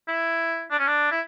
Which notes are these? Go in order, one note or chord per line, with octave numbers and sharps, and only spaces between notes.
E4
D4
C#4
D4
E4